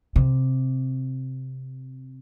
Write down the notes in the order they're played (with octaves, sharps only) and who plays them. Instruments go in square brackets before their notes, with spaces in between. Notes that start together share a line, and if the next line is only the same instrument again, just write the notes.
[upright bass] C3